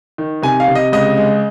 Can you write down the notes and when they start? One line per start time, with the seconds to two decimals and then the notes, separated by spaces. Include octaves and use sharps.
0.18 D#3
0.42 C3 G#5
0.60 F5
0.68 C3
0.75 D#5
0.92 C#2 D#5
1.17 G#3